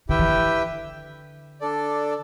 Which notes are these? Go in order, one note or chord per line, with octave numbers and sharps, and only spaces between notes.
D3 E4 G4 B4 E5 G5
E3
D3
D4 A4 D5